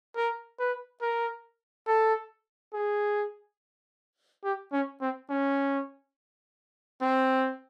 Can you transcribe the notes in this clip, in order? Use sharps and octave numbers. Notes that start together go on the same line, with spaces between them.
A#4
B4
A#4
A4
G#4
G4
C#4
C4
C#4
C4